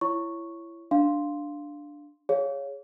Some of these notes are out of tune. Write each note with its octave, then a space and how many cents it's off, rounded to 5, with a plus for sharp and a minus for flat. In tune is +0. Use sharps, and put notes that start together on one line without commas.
E4 +30 C#5 +0 C#6 +0
D4 +0 F5 +0 C6 +0
G#4 +0 C#5 +0 F5 +0